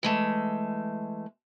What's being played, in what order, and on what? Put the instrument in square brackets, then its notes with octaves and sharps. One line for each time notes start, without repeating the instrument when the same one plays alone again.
[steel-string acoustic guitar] E3 G#3 A3